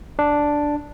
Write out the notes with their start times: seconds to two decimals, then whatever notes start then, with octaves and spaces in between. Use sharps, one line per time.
0.19 D4